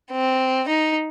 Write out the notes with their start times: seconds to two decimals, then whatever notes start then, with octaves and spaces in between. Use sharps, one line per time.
0.11 C4
0.68 D#4